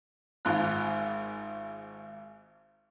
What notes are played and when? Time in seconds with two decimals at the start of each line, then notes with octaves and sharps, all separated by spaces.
0.45 G#1 G#2 F4 F#6